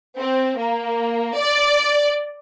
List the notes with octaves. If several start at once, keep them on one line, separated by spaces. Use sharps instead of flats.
C4
A#3
D5